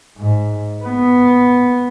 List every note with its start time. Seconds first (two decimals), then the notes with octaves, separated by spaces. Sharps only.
0.18 G#2
0.83 B3